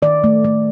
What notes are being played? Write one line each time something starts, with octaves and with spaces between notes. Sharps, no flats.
D#3 D5
A3
A3